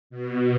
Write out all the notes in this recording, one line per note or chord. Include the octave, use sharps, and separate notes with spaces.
B2